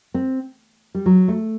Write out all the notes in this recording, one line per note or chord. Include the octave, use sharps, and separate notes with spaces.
C4
G3
F#3
A3